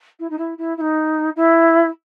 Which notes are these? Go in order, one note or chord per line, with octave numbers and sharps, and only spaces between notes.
E4
D#4
E4
E4
E4
D#4
E4